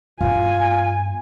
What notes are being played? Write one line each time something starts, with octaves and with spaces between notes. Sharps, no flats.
G2 B3 F4 G#5